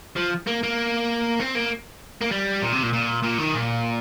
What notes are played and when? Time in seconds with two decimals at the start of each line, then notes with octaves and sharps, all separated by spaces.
0.17 F3
0.47 A#3
0.63 A#3
1.40 C4
1.55 A#3
2.21 A#3
2.31 G3
2.62 A#2
2.72 C3
2.83 A#2
2.93 A#2
3.23 A#2
3.39 D#3
3.54 A#2